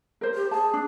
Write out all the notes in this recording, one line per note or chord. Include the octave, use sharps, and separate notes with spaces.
A#4 C5
G4
G#4 A5
D4